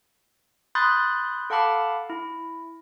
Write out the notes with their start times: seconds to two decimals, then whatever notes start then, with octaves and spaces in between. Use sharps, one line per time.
0.75 B5 C6 D#6 F#6 G6 A6
1.50 A4 F5 F#5 A5 B5 D6
2.10 E4